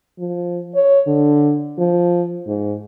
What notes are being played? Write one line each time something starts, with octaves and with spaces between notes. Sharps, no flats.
F3
C#5
D3
F3
G#2